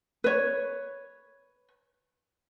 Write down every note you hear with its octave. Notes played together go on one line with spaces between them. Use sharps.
B4 C#5